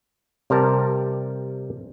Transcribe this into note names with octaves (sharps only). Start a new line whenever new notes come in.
C3 G3 A#4 A5